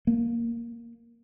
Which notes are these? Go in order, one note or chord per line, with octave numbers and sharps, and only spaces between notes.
A#3